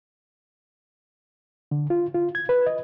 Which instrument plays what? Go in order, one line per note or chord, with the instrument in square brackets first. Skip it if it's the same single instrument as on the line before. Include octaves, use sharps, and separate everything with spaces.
[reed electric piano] D3
F4
F4
G#6
B4
D#5